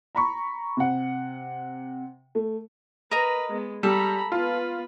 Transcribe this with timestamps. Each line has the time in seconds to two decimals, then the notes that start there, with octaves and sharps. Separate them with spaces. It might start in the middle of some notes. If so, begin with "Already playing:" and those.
0.15 A#5 B5 C#6
0.77 C3 F#5
2.35 A3
3.11 A#4 B4 D#5 A#5
3.49 G#3 B3
3.83 G3 A4 A#5 B5
4.32 B3 F4 B4